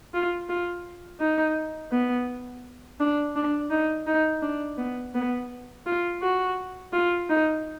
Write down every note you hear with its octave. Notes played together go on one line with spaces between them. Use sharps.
F4
F4
D#4
B3
D4
D4
D#4
D#4
D4
B3
B3
F4
F#4
F4
D#4